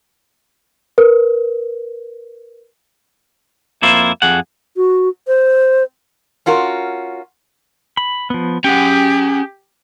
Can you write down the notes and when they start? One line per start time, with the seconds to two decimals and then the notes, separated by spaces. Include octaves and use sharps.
0.98 A#4 B4
3.82 F2 A#3 E4 F4 C5
4.22 F2 G#4 F#5
4.77 F#4
5.28 C5
6.46 C#4 F4 F#4 A#4
7.97 B5
8.30 F3 B3
8.64 C#4 G4 G#4 F#5 G5